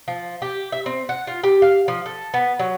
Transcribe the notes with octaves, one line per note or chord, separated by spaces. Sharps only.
F3
G4
E5
C4
F#5
F4
G4
F5
F3
A4
B3
F#3